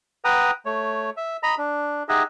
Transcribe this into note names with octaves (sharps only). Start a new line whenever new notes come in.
B4 F#5 G5 A#5 D#6
A3 C#5
E5
D#5 A#5 B5
D4
D#4 G4 G#4 D#5 E5 F#5